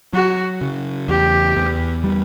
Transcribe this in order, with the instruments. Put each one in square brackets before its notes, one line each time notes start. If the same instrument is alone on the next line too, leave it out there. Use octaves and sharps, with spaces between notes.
[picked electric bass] F#3 [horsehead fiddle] F#4
[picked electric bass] C#3
[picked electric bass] E2 [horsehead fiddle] G4
[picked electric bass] E2
G3